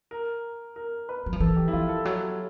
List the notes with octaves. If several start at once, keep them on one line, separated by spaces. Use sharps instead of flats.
A#4
A#4
B4
F#3
F3
E3 A4
G4
E4
F3 F4
A4
F#3